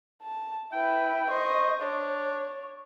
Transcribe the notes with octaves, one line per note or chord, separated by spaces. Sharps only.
A5
E4 B4 G5
C5 D#5 C#6
D4 C#5